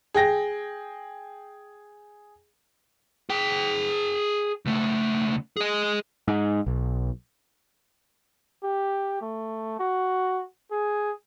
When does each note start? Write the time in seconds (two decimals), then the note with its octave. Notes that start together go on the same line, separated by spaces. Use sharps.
0.14 G#4 G5 A#6
3.29 G#4 G5
4.66 C#2 A3
5.57 G#4 D#5
6.28 G#2
6.66 B1
8.63 G4
9.21 A3
9.79 F#4
10.71 G#4